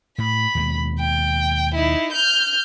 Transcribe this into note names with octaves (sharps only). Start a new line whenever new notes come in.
A2 B5
D#2 B2 G#3
G5
D#4 E4
F6 G6